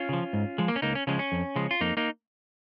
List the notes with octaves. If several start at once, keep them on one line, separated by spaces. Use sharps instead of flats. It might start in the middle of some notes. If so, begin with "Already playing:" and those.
Already playing: C#4 F4
C#3 F3
G#2
F3 G#3
A#3
C#4
C#2 A#3 D#4
C#4
C#3 F3 G#3 C#4
C#4
F2
C#3 F3 G#3
F4
F2 A#3 D#4
A#3 D#4